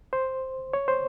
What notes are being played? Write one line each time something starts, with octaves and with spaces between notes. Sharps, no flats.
C5
C#5
C5